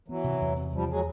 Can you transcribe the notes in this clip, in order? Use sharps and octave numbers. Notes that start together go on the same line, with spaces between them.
E3 F#3 B3
C3
E2
C3
E2 F3 G3
F3 F#3 G#3